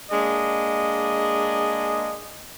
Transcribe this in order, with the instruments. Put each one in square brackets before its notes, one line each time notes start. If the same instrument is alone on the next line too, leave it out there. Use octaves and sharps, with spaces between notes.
[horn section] G#3 A#3 D4 D#5